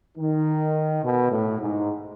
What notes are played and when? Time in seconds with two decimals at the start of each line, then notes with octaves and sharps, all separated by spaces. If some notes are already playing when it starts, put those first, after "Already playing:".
0.17 D#3
1.03 B2
1.31 A2
1.60 G#2